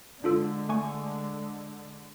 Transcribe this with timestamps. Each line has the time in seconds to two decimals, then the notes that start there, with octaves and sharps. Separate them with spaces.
0.24 D3 G#3 D4 F4 A4
0.69 A3 G#5 C#6